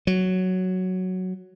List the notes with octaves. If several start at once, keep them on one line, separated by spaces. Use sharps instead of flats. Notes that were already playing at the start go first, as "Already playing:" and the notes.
F#3